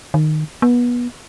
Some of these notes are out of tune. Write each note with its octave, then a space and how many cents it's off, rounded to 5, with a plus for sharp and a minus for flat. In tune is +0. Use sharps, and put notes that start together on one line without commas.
D#3 -15
B3 -25